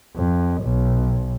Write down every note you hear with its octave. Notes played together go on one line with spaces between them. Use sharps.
F2
B1